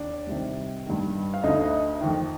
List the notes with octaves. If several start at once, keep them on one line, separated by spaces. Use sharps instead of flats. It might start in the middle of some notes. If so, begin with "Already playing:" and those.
Already playing: D#2 D4 D5
C2 C3 D#3
G2 D#3
F5
D2 D3 D#4 D#5
F2 D#3